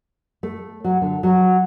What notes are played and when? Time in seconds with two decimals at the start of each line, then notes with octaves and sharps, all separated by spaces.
0.43 A3
0.84 F#3
1.02 D3
1.23 F#3